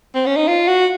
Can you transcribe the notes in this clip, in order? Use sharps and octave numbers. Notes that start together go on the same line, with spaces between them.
C4
C#4
D#4
F4
F#4